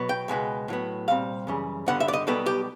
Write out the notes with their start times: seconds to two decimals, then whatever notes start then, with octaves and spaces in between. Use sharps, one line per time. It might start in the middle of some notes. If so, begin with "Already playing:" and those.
Already playing: B2 F#3 B3
0.09 G5
0.28 C#2 B2 G#3 B3
0.68 A2 F#3 B3
1.08 C2 A#2 G3 C4 F5
1.47 F#2 C#3 E3 G3
1.86 G2 D3 G3 B3 F#5
2.00 E5
2.08 D5
2.13 D#5
2.27 B1 B2 G3 B3 A4
2.46 G4